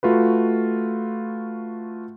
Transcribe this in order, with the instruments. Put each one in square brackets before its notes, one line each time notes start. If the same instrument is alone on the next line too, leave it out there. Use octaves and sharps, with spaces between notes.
[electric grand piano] A3 F4 F#4 B4